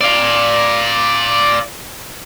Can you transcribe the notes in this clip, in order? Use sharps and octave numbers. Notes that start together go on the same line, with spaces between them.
D5 F5